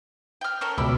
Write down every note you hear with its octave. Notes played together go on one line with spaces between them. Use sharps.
G5 F6
C#4 A4 A#4
C#2 B2 E4 D5 B5